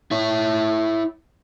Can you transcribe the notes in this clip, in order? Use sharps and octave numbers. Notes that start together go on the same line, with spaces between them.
E4 C#5